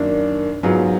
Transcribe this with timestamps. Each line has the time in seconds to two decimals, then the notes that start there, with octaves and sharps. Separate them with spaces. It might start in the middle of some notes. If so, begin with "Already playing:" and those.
Already playing: F#2 D#3 A#3 D4
0.63 G#2 F#3 B3 F4 G#4